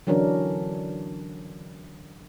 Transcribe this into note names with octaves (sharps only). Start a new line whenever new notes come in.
D3 E3 F#3 C#4 D4 A#4